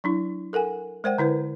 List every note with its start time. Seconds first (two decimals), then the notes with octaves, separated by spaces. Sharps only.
0.04 F#3 D4 E4
0.53 A4 A#4 F#5 G#5
1.04 G#3 A#4 C5 D5 F#5 G5
1.18 D3 E4 B4 C5